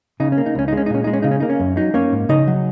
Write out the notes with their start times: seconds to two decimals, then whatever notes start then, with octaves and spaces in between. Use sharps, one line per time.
0.20 C#3 D#4
0.32 C#4
0.38 A#3
0.46 D#4
0.55 C#2 C#4
0.68 D#4
0.73 G#3 C#4
0.86 D#4
0.90 A#2 C#4
1.04 G#3 D#4
1.13 C#4
1.22 C#3 D#4
1.31 C#4
1.40 A#3 D#4
1.50 C#4
1.60 F#2
1.77 F#3 D#4
1.94 A#3 C#4 C#5
2.12 G#2
2.29 C#3 D#4 D#5
2.47 F#3